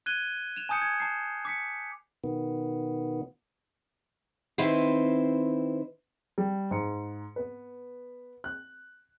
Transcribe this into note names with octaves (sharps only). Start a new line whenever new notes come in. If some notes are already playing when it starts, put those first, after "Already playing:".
F#6 G#6 D#7 G7
E7 F7
G#5 A5 D#6 G6 C#7
G#6
A5 C7
D6 B6 C#7
B2 D#3 B3
D#3 C4 E4 B4 C5
G3
G#2 C#7
B3 B4
F#6